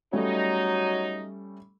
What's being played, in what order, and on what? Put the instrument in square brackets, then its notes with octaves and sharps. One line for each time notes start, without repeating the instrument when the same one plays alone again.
[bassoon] F#3 [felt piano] G3 A3 C#4 [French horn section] D#4